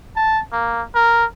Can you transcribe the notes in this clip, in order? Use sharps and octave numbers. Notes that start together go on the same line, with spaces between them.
A5
A#3
A#4